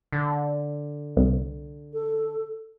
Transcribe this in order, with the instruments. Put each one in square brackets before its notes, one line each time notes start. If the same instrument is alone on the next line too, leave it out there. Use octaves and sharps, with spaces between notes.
[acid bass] D3
[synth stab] C2
[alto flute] A4